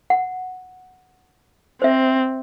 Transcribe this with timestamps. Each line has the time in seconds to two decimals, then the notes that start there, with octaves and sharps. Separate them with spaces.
0.10 F#5
1.82 C4 C5 E5